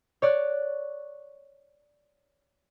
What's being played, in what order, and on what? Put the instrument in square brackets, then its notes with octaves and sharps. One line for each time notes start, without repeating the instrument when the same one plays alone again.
[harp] C#5 D5 F#6